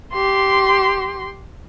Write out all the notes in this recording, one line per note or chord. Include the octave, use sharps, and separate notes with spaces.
G4 C6